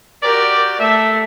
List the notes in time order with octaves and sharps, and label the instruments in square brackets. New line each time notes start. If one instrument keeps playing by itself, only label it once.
[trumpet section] F#4 G4 D5 [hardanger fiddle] A#4
[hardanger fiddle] A3 [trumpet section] E5